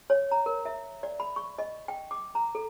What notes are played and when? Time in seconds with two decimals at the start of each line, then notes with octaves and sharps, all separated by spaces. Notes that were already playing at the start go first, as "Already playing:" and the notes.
0.10 C#5
0.31 A#5
0.46 A#4
0.65 E5
1.03 D5
1.20 B5
1.36 C#6
1.58 D#5
1.88 G5
2.11 D6
2.35 A#5
2.55 A4